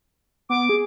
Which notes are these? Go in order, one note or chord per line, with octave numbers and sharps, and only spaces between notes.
B3 D6
G#4